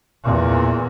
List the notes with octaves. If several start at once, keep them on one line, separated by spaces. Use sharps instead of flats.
E2 A#2